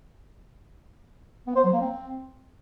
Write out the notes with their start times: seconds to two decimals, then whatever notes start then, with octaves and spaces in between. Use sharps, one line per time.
1.47 B3
1.56 C5
1.64 F#3
1.73 A#3
1.81 C4